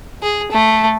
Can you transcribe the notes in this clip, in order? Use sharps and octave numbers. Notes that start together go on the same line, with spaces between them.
G#4
A3